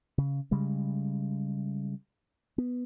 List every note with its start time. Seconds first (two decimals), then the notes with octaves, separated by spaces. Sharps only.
0.18 C#3
0.51 C#3 G3 G#3
2.58 B3